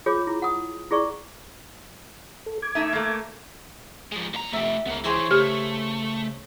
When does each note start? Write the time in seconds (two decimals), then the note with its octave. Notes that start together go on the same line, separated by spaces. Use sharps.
0.06 F4 G#4 C#5 D6
0.27 E4
0.42 F#5 D#6
0.91 E4 G#4 D5 C#6
2.46 A4
2.62 D6 G#6
2.75 A3 D#4 E5
2.93 A3 A#3
4.12 F3 G#3
4.34 A#2 A#5
4.53 F1 A3 G4 E5
4.87 C#2 B3 A#4
5.04 E3 G#4 C5 C#5
5.31 C#3 A3 G4